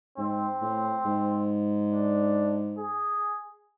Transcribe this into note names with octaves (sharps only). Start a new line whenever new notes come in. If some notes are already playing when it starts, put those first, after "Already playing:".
G#2 C4
A2
G#2
D4
G#4